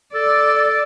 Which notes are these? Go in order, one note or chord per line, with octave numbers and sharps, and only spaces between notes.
A4 D5